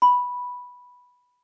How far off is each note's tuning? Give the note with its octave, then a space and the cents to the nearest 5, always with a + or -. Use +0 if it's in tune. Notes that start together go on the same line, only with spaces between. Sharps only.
B5 -5